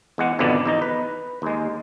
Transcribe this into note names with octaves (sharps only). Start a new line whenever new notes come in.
E2 G#3 F#5
G#1 F2 B2 D3 B3 D5
E2 D#4 D#5
B4
D#2 G#3